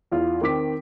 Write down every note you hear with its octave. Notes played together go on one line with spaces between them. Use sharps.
E2 F4
D#3 C4 D6 B6